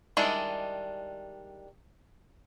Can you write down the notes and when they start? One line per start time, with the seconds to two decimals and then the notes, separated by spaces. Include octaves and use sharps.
0.17 D#3 G3 G#3 D4 E4